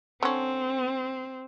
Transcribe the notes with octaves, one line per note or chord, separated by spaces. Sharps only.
D3 C4 C#4